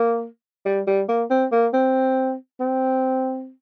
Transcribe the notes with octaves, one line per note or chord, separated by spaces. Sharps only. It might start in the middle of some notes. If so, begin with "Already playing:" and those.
Already playing: A#3
G3
G3
A#3
C4
A#3
C4
C4